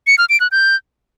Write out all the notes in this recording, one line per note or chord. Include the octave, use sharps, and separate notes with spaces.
C#7
F6
D7
F#6
G6